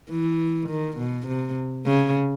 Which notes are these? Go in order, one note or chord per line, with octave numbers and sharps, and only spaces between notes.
E3
D#3
B2
C3
C#3